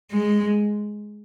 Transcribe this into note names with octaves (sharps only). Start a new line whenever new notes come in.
G#3